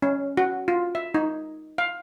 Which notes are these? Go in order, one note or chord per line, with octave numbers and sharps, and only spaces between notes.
C#4
F#4
F4
E5
D#4
F5